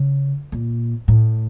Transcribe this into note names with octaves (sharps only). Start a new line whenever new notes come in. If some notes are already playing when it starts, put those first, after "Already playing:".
Already playing: C#3
A#2
A2